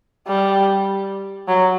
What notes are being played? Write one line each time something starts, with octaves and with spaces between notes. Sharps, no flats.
G3
F#3